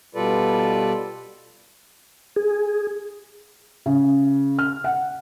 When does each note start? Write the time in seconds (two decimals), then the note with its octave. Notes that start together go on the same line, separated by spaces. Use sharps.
0.15 B2 G3 F4 A4 B4 D5
2.36 G#4
3.86 C#3
4.59 F6
4.84 F#5